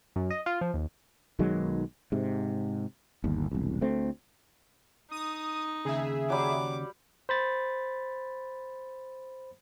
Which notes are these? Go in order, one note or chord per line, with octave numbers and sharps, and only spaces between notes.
F#2
D#5
F4
F3
D#2
B1 D#3 F#3 G#3
G#2 C3
G1 D#2
E1 C2
D2 A3 C4
D#4 D#6
D#2 C#3 G#4 E5
F#3 G3 D6
C5 B5 A6